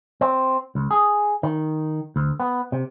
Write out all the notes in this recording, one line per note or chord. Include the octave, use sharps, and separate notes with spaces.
C4
C#2
G#4
D#3
D2
B3
C3